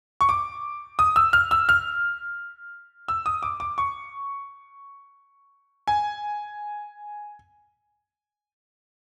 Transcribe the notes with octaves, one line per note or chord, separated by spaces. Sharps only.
C#6
D6
D#6
E6
F6
E6
F6
E6
D#6
D6
D6
C#6
G#5